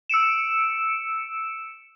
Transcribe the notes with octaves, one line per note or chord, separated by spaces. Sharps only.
E6 C#7 D7 E7